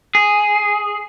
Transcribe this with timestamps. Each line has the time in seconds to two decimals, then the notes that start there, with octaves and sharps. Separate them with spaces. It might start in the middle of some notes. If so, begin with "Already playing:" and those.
0.15 G#4